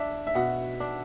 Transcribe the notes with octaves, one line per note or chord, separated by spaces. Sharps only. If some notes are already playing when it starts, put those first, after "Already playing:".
Already playing: D4 E5
E5
B2 F#5
D4